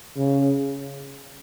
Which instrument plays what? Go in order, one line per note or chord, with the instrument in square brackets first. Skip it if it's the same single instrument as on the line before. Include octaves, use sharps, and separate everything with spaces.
[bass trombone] C#3